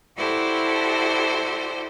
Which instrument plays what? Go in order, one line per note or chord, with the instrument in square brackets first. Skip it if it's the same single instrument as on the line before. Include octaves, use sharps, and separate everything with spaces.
[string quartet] E4 F#4 G4 A4 C5 D5